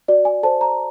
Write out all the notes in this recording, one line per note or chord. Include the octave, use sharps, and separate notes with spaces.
F#4 D5
G#5
A4 C5 A5
A#5